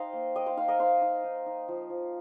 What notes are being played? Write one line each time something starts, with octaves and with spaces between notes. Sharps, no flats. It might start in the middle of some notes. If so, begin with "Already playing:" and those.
Already playing: D#4 C5 D#5 F5 G5
A#3
A#3 D#5 G5
C5 F5
D#4 C5 F5
A#4 D#5
D#4 C5 F5
D#4
D#4
D#4
F3
F3